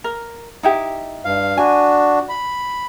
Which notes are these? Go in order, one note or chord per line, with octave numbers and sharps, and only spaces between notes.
A#4
D#4 E4 G4
G2 F5
D4 F#4 G#5
B5